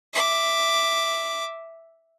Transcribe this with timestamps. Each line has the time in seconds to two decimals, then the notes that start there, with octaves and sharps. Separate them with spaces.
0.14 E5 D6